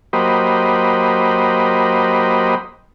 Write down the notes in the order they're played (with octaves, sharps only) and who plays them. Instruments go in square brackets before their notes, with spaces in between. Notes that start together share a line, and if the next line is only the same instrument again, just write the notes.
[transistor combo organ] F#3 A#3 G4 C5 D#5 B5